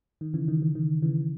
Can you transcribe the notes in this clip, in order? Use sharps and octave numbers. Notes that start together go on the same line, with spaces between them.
D#3
C#3 E3
D#3
D#3
D#3
C#3 E3